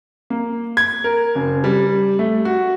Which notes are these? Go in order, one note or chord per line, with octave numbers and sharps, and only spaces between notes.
A#3
G#6
A#4
F#1
G3
A3
F#4